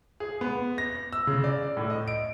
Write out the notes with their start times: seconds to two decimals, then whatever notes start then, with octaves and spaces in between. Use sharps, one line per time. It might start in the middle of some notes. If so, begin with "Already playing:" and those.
0.20 G#4
0.41 B3
0.78 A#6
1.13 E6
1.27 C#3
1.44 D5
1.77 A2
1.90 D#5
2.08 D7